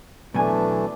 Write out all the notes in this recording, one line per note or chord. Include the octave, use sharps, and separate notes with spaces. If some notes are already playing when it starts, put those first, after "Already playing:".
B2 E3 F#3 A3 D4 G#5